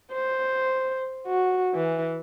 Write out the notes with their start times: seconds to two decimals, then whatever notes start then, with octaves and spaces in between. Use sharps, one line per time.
0.13 C5
1.27 F#4
1.75 E3